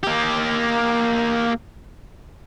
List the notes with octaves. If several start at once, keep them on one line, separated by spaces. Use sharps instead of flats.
A#3 G4